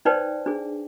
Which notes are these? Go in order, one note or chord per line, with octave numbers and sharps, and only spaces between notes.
D#4 B4 C5 D5 G5 A5
D4 G#4